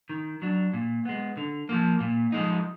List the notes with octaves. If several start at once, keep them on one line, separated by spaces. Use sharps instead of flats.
D#3
F#3 D4
A#2
G#3 B3
D3
F3 A#3
A#2
F3 G#3 D#4